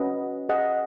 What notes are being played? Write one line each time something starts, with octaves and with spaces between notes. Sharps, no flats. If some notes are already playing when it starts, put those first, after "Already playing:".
Already playing: C#4 F#4 B4 D#5 F#5
G#4 D#5 F#5